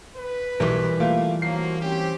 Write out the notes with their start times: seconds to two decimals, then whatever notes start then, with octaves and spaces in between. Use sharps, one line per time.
0.17 B4
0.60 B1 E3 G3 A#4
1.00 A3 A#3 F4
1.42 F3 F#3 A#3 C7
1.82 C4 C#4 G4